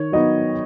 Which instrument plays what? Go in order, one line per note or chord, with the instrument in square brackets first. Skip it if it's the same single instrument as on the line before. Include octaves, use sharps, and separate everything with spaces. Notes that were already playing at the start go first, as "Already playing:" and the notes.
Already playing: [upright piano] D#3 C#5
F#3 B3 D#4 D#5